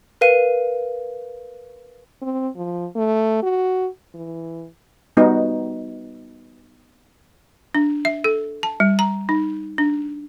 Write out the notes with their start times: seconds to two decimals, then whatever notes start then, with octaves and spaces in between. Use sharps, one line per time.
0.21 A#4 B4 F5 D#7
2.22 C4
2.56 F3
2.96 A3
3.43 F#4
4.14 E3
5.17 G3 B3 D#4 F#4
7.75 D4
8.05 E5
8.24 A4
8.63 A5
8.80 G3
8.99 A#5
9.29 D#4
9.78 D4